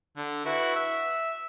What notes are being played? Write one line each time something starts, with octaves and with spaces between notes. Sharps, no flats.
D3
E4 F#4 B4
E5